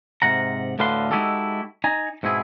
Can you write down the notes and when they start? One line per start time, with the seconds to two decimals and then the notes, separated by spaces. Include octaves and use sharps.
0.22 G#2 C3 F#5 A#5
0.79 D2 A2 D3 B4 F5 C6
1.11 G#3 D#4 E4 F#4 G4 A4
1.84 D#4 G#5 A#5
2.23 G#2 B2 C4 E4 G#4